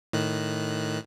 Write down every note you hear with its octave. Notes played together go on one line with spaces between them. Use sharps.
A2 D#3 F#6